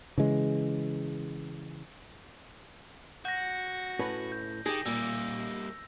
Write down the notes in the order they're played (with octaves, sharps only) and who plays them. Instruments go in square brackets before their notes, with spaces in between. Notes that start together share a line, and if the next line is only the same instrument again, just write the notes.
[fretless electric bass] C#3 E3 G#3
[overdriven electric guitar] F#4 [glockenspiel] G6 A#6
[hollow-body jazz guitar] A2 C#4 B4
[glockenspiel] G6
[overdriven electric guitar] D#3 [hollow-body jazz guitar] G4 G#4 [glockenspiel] A#6
[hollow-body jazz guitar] A#2 [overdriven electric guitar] G3 A#3 [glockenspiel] E6